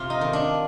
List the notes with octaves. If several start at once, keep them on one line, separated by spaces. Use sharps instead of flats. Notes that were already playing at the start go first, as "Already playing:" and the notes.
Already playing: C3 F4
D#4
D#3
D4